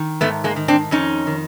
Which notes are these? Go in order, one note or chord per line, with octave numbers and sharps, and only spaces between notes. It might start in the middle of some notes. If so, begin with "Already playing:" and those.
Already playing: D#3
G#2 A3 B3
G#3 A#3
D#3
C4 D4
F2 C#4 D#4
D#3